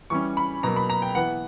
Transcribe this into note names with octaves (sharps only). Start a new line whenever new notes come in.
E3 G3 C#4 C#6
B5
B2 F#3 A#3 A#5
B5
A#5
G5
E3 B3 F#5